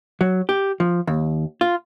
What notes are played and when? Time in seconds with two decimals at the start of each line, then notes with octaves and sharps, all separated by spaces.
0.21 F#3
0.49 G4
0.80 F3
1.07 D#2
1.61 F4